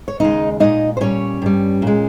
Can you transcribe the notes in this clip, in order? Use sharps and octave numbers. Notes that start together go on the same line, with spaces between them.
C#5
D#2 C#3 G#3 D#4 D#5
A#2 G#3 D#4 D#5
C5
A#2 G3 C#4 C#5
G2 G3
A#2 G#3